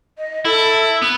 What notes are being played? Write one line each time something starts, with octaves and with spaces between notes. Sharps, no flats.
D#5
E4 A4
B3